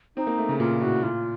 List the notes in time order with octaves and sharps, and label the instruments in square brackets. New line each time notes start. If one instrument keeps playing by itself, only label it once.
[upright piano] C4 [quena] D#4
[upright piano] A#3
A3
C#3
[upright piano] A#2 [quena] F4
[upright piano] A2 [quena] F#4
[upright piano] A#2 [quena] F4